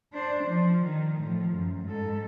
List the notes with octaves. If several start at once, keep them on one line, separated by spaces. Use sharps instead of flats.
D4 C5
F3
D#3
A2 F3
F#2
G#2 A4